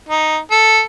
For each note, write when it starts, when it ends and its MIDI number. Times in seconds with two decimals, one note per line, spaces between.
0.09 0.38 63
0.51 0.82 69